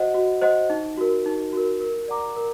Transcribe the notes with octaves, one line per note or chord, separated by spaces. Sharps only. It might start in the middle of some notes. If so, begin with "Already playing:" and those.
Already playing: F#4 C5 D#5 F#5
F#4
C5 D#5 F#5
D#4
F#4 A#4
D#4
F#4 A#4
A#4
D5 F#5 A#5 D6
A#4